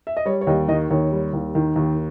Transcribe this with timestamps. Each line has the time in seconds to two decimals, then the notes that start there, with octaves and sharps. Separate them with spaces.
0.07 E5
0.17 D#5
0.25 G3 C#5
0.41 C#5
0.47 D#2 D#5
0.68 D#3 D#5
0.91 D#2 C#5
1.12 G3
1.33 D#2
1.55 D#3
1.76 D#2